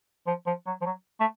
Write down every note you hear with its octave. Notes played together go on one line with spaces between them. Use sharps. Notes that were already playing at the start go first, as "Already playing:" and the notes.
F3
F3
F#3
F3
F#3
A3